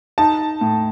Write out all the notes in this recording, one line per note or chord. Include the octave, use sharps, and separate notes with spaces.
D#4 A5
A2